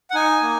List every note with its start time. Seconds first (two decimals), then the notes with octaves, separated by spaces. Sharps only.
0.10 F#5
0.14 D#4 G#5
0.42 A#3